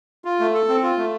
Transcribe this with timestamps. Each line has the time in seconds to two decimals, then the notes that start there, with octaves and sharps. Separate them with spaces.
0.25 F4
0.40 A3
0.54 A4
0.69 C4
0.83 F4
0.98 A3